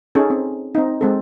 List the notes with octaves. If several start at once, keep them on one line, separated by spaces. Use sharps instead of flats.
C#4 D#4 G#4 A4
C4
C4 D#4
G#3 C4 A4